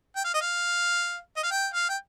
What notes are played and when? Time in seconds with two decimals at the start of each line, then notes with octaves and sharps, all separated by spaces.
0.16 G5
0.25 F5
0.34 D#5
0.41 F5
1.37 D#5
1.43 F5
1.51 G5
1.74 F5
1.89 G5